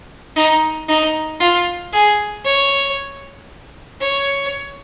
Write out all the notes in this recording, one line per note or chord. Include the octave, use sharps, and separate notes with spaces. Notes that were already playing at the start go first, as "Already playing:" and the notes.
D#4
D#4
F4
G#4
C#5
C#5